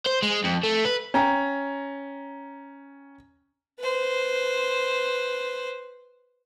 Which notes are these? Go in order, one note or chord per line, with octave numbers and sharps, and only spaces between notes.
C5
G#3
F2
A3
B4
C#4 G5 A#5
B4 C5